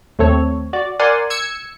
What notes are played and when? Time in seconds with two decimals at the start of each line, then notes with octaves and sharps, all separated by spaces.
0.19 D#2 A3 C4 A4 C#5
0.73 F#4 D5
1.00 A#4 D5 F#5 G#5 C6
1.30 E6 G#6 C#7